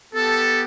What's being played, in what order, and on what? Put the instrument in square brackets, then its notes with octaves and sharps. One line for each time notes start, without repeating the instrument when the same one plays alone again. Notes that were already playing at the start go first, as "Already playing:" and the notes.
[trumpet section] B3 G4 A4